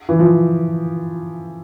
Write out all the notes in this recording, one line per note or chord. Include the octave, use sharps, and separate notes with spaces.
E3
F3